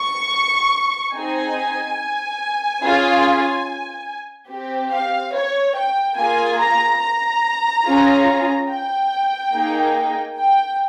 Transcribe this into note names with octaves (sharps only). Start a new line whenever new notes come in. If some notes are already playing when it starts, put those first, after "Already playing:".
Already playing: C#6
C4 D#4 G#4 G#5
C#4 F4 G#4
C4 G4
F5
C#5
G5
A#3 F4 G#4 G#5
A#5
A#5
C#4 F4 G#4
G5
A#3 D#4 G#4
G5